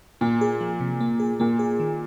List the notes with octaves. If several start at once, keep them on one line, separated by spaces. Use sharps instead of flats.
A#2 A#3
G#4
F3
C3
A#3
G#4
A#2 A#3
G#4
D#3